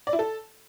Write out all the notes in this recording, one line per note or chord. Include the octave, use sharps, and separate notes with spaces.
D5
E4
A4